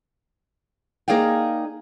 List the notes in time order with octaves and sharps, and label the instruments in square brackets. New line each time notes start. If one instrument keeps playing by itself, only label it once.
[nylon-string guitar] A#3 D#4 G#4 D5 F5 G5